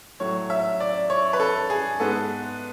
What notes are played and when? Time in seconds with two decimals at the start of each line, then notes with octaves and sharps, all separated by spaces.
0.20 A2 F#3 A3 C#5
0.50 E5
0.80 D5
1.10 C#5
1.33 B4
1.40 A4
1.70 G#4
1.99 G#2 G#3 B3 A4